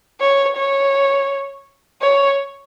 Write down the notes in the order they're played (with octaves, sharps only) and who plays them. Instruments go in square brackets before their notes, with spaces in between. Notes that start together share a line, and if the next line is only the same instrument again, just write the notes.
[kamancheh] C#5
C#5
C#5